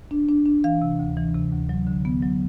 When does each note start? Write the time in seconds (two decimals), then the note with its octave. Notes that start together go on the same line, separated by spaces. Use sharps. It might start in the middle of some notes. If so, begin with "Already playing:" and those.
0.11 D4
0.29 D4
0.46 D4
0.64 E3 F5
0.82 C3
0.99 D2
1.17 E3
1.35 C3
1.52 D2
1.69 F#3
1.87 D3
2.05 B3
2.22 F#3